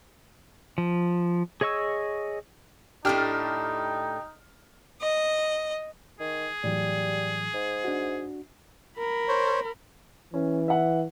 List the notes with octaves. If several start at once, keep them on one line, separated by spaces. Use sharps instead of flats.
F3
G#4 C#5 D#5 C#6 E6
A2 A3 D4 D#4 G4 F6
D#5
D#3 G#4
A2 E3 F#3 G3
G#2
D4 F#4
A#4 B5
C5 C#5
E3 C#4
E5 F#5